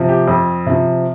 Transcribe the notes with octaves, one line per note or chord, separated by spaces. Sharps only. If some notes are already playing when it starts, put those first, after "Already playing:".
Already playing: C3 F3
G4
F2
C3 F3